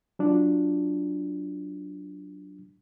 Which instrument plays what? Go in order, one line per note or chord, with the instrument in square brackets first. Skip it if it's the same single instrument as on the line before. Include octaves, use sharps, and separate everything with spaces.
[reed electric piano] F#3 D4 F4